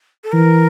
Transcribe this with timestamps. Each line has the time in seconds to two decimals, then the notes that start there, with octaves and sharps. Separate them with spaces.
0.24 A4
0.32 E3 A#4